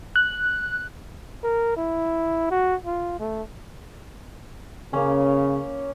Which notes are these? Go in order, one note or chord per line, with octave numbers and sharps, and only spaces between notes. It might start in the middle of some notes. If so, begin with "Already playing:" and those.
F#6
A#4
E4
F#4
F4
A3
C#3 A#3 C#4